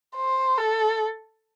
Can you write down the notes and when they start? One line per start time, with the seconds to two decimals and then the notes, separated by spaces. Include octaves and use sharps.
0.16 C5
0.58 A4